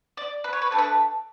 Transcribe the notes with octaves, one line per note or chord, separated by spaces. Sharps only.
D5
B4
C#5
B4
A3 D4 A4 C#5
B4